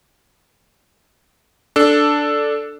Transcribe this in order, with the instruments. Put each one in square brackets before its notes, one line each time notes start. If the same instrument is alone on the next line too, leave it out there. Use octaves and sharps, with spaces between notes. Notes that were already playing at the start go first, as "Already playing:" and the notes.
[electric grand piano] D4 A4